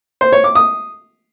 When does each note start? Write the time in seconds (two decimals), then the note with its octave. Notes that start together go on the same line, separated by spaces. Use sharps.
0.21 C5
0.32 C#5
0.44 D6
0.55 D#6